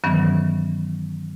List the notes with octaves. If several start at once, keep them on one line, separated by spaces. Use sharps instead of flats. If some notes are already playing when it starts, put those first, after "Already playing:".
G2 D#3 E3 F#3 B3 C#4